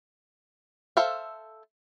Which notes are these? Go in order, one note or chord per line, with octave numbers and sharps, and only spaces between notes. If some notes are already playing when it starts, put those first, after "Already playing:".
A4 C5 E5 F5